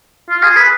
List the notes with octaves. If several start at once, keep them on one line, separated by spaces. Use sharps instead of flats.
F4
G#4
B4